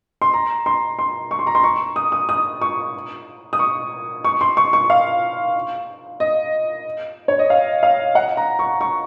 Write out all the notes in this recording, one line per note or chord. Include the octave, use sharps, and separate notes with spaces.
C6
A#5
C6
C6
C#6
C6
A#5
C6
C#6
D#6
D#6
D#6
C#6
D#6
C#6
C#6
C6
C#6
C#6
F5
D#5
C#5
D#5
F5
F5
F#5
A#5
C#6
C#6